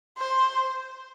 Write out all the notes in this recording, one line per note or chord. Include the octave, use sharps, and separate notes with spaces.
C5